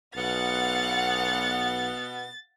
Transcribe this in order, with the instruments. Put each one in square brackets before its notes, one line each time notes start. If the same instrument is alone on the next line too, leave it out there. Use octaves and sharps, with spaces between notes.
[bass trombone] B1 [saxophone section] B2 B3 [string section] F5 F#5 [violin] A6